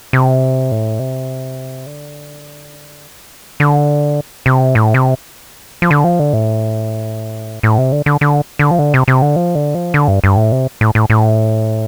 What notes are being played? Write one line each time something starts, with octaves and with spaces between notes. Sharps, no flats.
C3
A2
C3
D3
D3
C3
A2
C3
F3
D3
F3
D3
A2
A2
C3
D3
D3
D3
D3
F3
D3
C3
C3
D3
F3
D3
F3
D3
G2
G2
A2
C3
A2
A2
A2